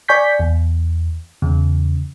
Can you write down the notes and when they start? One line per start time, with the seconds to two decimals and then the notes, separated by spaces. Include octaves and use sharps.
0.08 D5 G#5 C#6 G6 B6
0.39 E2
1.42 E2 C#3